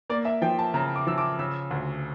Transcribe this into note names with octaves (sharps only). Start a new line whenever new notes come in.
A#3 D5
E5
F3 G5
A5
C#3 A#5
D6
F3 E6
D6
C#3 E6
D2